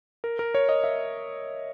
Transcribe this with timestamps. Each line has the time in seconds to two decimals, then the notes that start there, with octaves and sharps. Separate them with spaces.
0.24 A#4
0.39 A#4
0.55 C#5
0.69 D#5
0.84 E5